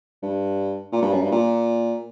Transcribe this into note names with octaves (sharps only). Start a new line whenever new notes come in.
G2
A#2
G2
F#2
G2
A#2